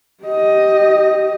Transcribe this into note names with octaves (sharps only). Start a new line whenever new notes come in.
G4 D#5